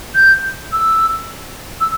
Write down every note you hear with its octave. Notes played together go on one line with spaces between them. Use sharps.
G6
E6
E6